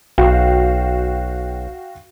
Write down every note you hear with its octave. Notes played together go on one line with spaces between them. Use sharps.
B1 F#4 F5 G5